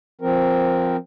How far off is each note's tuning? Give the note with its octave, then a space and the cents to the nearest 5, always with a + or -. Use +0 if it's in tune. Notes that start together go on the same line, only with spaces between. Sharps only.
F3 +0 C4 +0 A#4 +0